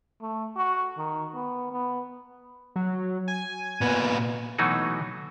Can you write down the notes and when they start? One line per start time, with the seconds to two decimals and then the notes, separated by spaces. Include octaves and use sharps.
0.21 A3
0.56 F#4
0.98 D#3
1.34 B3
1.72 B3
2.76 F#3
3.28 G#5
3.81 A#2 B3
4.58 B2 E3 F#3 A3 D#4 F#4